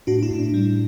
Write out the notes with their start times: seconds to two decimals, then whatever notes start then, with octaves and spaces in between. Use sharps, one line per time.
0.07 A2 D4 F#4
0.23 E4
0.31 A2
0.39 D4
0.54 G3